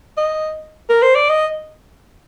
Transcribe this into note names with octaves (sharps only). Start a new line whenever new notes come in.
D#5
A#4
C5
D5
D#5